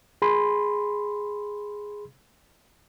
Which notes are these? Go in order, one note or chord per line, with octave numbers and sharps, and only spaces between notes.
G#4 B5 C6